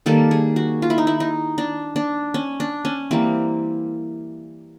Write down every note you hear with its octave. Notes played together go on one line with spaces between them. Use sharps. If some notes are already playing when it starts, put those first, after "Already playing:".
D#3 G3 A#3 A4
G#4
F#4
F4
E4
D#4
E4
D#4
D4
D4
C#4
D4
C#4
E3 G3 A#3 C4